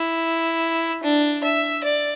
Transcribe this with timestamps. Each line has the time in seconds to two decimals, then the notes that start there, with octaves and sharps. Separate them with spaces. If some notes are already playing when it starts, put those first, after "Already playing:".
Already playing: E4
1.03 D4
1.44 E5
1.84 D5